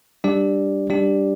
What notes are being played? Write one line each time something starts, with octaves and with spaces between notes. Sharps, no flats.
G3 D4 G4 D5
G3 D4 G4 D5